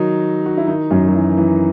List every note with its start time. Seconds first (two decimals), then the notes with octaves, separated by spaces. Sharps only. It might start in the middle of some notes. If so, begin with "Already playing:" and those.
Already playing: D#3 F#3 D#4 F#4
0.46 F#4
0.57 E4
0.67 D#3 D#4
0.90 F#2 F#3
1.08 F#3
1.14 E3
1.37 E3